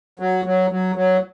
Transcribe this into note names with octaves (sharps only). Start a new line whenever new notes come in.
F#3
F#3
F#3
F#3